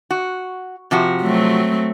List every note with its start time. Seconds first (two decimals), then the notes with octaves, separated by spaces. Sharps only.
0.11 F#4
0.91 C3 F3 F#4
1.22 F#3 A3 C4